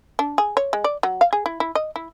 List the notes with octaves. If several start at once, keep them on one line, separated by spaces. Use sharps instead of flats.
D4
G#4
C#5
G#3
D5
F#3
F5
G#4
E4
E4
D#5
E4